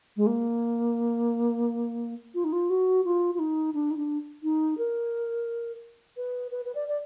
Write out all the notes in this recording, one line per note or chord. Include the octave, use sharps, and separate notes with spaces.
G#3
A#3
F4
D#4
F4
F#4
F4
F4
D#4
D4
D#4
D4
D#4
A#4
B4
B4
B4
D5
D5